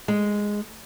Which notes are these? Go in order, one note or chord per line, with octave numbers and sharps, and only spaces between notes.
G#3